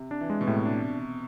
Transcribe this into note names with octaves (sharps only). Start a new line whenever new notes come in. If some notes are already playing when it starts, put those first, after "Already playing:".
Already playing: C3
D4
E3
G#3
B2
A2 C3
D4